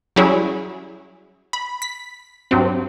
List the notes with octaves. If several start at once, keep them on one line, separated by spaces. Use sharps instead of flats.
F#3 G3 C#4 E4 G#4 C#5
B5
B6
G2 F#3 C4